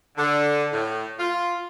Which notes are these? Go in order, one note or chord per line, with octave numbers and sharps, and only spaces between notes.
D3
A2
F4